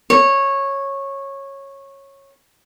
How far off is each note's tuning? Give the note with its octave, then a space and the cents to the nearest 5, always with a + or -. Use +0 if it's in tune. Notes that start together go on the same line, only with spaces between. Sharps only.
C#5 -15